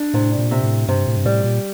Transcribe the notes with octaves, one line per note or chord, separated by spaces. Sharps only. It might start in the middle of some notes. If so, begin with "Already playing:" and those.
Already playing: D4
A2 C3
A#2
C3
A2
G2 C3
A2
G2
A2 G3
A#2